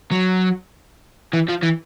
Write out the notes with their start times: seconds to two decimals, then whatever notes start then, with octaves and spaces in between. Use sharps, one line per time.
0.11 F#3
1.33 E3
1.49 F3
1.63 E3